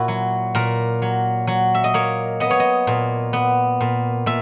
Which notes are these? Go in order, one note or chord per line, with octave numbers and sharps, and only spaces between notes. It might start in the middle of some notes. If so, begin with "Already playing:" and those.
Already playing: A#2 E4 F#4
F#3
A#2 A#4
F#3
F#3
E5
D#5
A#3 C#5
B3 D#5
C#5
D#5
A#2
B3
A#2
A#2 E5